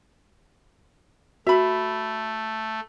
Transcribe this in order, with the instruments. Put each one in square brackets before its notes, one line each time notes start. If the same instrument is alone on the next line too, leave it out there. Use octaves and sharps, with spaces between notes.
[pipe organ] A3 [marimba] F#4 [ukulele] E5 B5